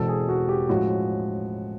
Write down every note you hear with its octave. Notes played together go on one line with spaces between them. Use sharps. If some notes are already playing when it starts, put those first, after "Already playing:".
Already playing: E1 E2 B2 G#3 C4 A4
G#4
F#4
G4
A2 F3 G#3 C#4 E4 F#4